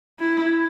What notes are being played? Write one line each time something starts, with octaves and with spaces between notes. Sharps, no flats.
E4